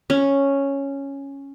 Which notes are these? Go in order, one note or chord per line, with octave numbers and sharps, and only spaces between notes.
C#4